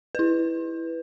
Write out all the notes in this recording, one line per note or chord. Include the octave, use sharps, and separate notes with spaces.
E4 B4